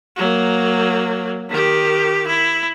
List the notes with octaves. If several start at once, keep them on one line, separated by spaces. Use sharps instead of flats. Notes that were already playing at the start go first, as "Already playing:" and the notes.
F#3 A#3
D#3 G4
E4